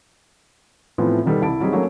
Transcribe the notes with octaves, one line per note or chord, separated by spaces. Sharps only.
A2 E3 F3 B3 C4 F4
B2 D#3 G3 B3 D#4 A4
C2 E4 A5 D7
F#3 G3 C4 D#4 G#4
F#3 A3 A#3 C#4